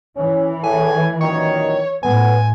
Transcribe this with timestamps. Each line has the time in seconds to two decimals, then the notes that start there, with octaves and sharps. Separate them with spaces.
0.17 E3 C#4
0.64 E2 A2 G#5
1.21 F#2 A#2 D#3 C#5
2.03 A2 B3 G#5